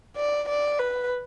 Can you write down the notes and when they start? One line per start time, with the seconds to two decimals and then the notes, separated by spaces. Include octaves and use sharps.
0.16 D5
0.48 D5
0.79 B4